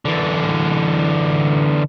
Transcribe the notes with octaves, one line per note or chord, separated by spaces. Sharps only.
D3 E3